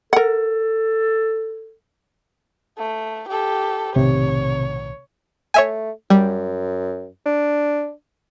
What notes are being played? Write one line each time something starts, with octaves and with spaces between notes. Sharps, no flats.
A4 A#4 F#5
A3
G4 A4
B1 A2 C3 D#3 C#5
A3 C#5 E5 G#5
F#2 G3
D4